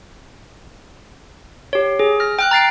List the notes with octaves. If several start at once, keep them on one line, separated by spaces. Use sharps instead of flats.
G4 C#5
G#4
F6 A#6
G5 F6 F#6
A#5 A6 C7 D7